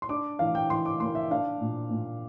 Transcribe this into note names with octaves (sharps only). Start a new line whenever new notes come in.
C6
D4 D6
E3 F5
G5
E3 C6
D6
A#3 C6
E5
D4 F5
A#2
A#2